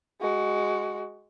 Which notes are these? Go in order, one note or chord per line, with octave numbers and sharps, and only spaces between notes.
G#3 F#4